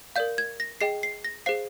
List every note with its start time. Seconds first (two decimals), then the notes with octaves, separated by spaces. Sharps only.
0.16 A#4 D5 F5 G6
0.38 G#6
0.60 A#6
0.81 G#4 D#5 G5 C7
1.03 C7
1.24 A#6
1.46 G#4 C5 F5 C7